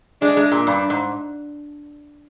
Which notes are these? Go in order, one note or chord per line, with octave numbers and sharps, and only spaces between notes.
G#3 D4
G#3
A#2
G2 D4
G#2